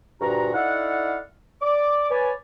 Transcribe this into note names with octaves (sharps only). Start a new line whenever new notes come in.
D2 G2 A#2 F#4 A#5
D#4 E4 A4 D5 F5 F#5
D5 D6
B4 C#5 D5 G#5